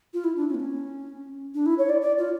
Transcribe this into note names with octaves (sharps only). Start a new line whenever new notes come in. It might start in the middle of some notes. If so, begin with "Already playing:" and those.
F4
E4
D4
C#4
A#3
C#4
D4
E4
C#5
D5
D5
F4